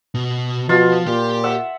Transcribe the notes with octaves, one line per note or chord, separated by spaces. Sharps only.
B2
B2 F3 F4
A#2 G4 G5
E5 F#5